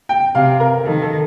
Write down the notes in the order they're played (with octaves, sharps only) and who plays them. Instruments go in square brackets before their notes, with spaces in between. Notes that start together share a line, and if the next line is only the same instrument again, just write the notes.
[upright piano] G5
[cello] C3 [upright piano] F5
[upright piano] A#4
[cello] D#3 [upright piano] A4
[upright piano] A4